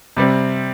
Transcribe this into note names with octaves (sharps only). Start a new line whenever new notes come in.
C3 G3 C4